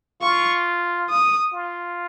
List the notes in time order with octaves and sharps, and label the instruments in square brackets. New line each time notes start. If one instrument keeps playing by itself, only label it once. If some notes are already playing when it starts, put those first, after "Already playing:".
[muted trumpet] F4 [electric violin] C#6
[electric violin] D#6
[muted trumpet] F4